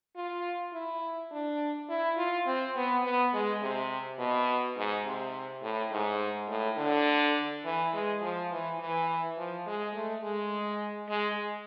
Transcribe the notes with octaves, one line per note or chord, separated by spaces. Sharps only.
F4
E4
D4
E4
F4
C4
B3
B3
G#3
C3
B2
G#2
C3
A2
G#2
A2
D3
E3
G#3
F3
E3
E3
F3
G#3
A3
G#3
G#3